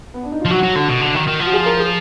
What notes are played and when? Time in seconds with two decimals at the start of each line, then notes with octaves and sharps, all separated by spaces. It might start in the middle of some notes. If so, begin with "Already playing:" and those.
0.14 B3
0.23 D4
0.32 D#4
0.41 F4
0.45 F3
0.50 F#3 F#4
0.63 F#3
0.75 D3
0.89 B2
1.01 D3
1.15 D#3
1.27 D#3
1.40 F3
1.45 F#4
1.53 G#4
1.66 A#4
1.79 G#4